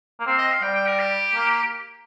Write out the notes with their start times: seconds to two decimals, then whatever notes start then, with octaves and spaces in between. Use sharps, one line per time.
0.20 A#3
0.26 C4 F5
0.38 D#5
0.51 F5
0.62 G3 G5
0.75 G5
0.87 A#4
0.99 G4
1.35 A#3